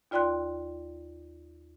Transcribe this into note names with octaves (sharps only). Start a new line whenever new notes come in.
D#2 F4 D5 G5 C6 F#6